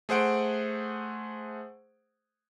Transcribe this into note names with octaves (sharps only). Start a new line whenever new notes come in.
A3 G#4 C5 F#5 D7